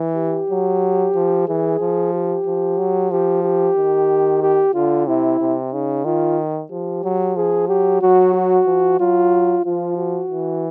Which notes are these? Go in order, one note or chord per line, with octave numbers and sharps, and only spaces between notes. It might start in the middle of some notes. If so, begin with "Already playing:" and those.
Already playing: E3
G4
F#3
F3
E3 G#4
F3
G4
F3
F#3
F3 G4
G4
D#3
G4
D3 F4
C3 E4
C3
C#3 D#4
D#3 F4
F3 G4
F#3
F3 G#4
F#3 G4
F#3 F#4
F#4
F3
F#3 F4
F3 F4
F#4
E3